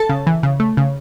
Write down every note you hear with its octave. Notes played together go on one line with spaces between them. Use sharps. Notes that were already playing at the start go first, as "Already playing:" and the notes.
Already playing: A4 A5
C#3
E3
C#3
A3
C#3